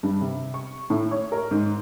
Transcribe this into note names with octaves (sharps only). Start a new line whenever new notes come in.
G2
C3
C#6
A2
C#5
A#4
G#2